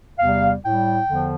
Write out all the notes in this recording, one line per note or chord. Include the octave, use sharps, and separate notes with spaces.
E2 C3 G3 F5
A2 G3 G5
E2 D3 F3